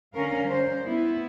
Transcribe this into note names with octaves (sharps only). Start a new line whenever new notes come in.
D3 C#4 A#4 F5
G3 C5
B3 E4